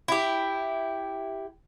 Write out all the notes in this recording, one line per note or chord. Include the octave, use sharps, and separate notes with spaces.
E4 G4